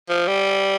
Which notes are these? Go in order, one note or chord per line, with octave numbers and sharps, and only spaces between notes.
F3
G3